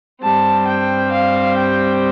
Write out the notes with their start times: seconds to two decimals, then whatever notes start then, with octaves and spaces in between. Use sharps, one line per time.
0.22 G2 G3 C4 A5
0.67 G5
1.12 F5
1.57 G5